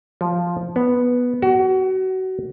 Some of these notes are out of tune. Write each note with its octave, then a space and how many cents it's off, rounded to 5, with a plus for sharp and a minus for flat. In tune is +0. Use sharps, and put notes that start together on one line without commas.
F3 +0
B3 -5
F#4 +25